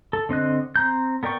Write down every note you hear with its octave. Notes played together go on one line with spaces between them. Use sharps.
A4
D3 C4 D#5 F#6
C4 A#5 G6
B3 A#4 D5 G5 C#6